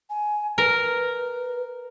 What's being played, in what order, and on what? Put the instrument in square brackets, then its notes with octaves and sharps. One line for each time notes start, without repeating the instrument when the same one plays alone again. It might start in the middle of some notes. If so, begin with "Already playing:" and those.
[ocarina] G#5
[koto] A#4 [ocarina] B4